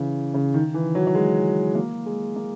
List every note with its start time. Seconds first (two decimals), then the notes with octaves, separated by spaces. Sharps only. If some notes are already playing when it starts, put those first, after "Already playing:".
Already playing: C#3 E3
0.34 C#3
0.54 D#3
0.74 E3
0.95 F#3
1.07 F#3
1.15 G#3
1.75 A#3
2.06 G#3
2.36 A#3